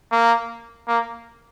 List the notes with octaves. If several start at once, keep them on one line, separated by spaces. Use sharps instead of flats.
A#3
A#3